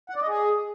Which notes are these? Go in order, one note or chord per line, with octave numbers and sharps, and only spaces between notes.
F#5
D5
D#5
G#4